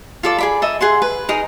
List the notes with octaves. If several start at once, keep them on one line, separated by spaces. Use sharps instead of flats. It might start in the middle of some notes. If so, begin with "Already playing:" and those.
F4 A4 D5
G#4 D5 B5
A4 D#5 E5
G#4 F#5 C6
B4
D#4 G#4 A#4